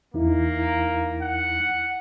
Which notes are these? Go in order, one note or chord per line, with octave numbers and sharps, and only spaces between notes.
E2 A#3 D#4 E4
F#5